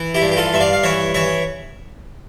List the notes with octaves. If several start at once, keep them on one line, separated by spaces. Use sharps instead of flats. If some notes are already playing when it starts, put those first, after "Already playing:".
Already playing: E3
E4 G4
G2
G4
F4 A4
G2 E5
D5 F5
F5
E3 C#5 E5
E3 C#5 E5